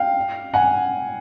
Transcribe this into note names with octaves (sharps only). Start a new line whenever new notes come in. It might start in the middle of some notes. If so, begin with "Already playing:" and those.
Already playing: F5 G5
F#5 G#5